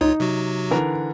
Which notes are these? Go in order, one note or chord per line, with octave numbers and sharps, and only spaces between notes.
C#2 D#4 F4 C#5
C3 F#3 F#4
D3 E3 A#4